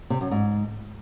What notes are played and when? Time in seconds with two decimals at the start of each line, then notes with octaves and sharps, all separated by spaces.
0.10 C3
0.21 F#2
0.31 G#2